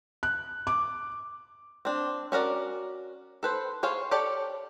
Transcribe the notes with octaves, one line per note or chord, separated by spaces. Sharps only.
F#6
D6
C4 D4
C#4 F#4 A#4 D5
A4 B4 C5
G#4 C5 C#5 F5
G4 A4 C#5 D5